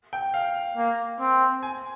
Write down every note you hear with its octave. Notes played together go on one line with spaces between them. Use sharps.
G5
F5
A#3
C4
G#5